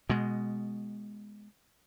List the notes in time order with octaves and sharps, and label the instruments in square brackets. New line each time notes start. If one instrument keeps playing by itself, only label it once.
[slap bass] B2 G#3